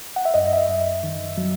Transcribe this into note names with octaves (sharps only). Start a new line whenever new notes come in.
F#5
E5
F#2 D#5
E5
D#5
F#2
D#3
F#3